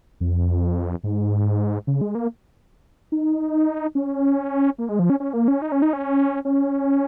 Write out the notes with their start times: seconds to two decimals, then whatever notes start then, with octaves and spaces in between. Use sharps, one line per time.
0.20 F2
1.04 G#2
1.87 C#3
2.01 G#3
2.15 A#3
3.12 D#4
3.95 C#4
4.78 A#3
4.89 G#3
4.99 F3
5.10 C#4
5.20 C#4
5.33 A#3
5.48 C#4
5.62 D#4
5.72 C#4
5.82 D#4
5.93 C#4
6.45 C#4